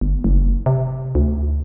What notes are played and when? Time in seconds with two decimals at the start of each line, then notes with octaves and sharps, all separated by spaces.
0.01 G1
0.24 F#1
0.66 C3
1.15 D2